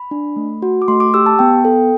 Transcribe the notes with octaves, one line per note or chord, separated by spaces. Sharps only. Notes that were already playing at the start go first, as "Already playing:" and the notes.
Already playing: B5
D4
A3
F#4
D6
A3 C6
D6
G4 E6
A5
B3 G5
A4